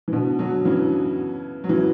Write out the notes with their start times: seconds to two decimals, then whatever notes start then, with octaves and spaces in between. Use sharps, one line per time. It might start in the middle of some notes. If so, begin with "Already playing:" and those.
0.08 E3
0.13 B2 D3
0.39 D3 F#3
0.65 C#3 E3
1.64 F#3
1.69 C#3 E3